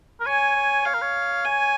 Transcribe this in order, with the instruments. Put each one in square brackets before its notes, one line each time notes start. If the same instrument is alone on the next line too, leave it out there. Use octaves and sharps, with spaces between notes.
[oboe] A#4
[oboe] C#5 [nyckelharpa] G#5
[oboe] C#5
[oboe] C#5 [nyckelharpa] F5
[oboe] A#4
C#5
[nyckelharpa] G#5